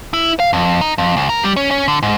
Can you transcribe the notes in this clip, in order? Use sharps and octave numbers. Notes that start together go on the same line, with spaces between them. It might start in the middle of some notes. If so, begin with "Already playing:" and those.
E4
F5
F2
D#4
F2
C#2
A#4
G3
C#4
C#4
D3
G#2